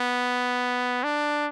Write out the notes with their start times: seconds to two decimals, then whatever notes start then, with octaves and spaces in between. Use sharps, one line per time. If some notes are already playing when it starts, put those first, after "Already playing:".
Already playing: B3
1.03 D4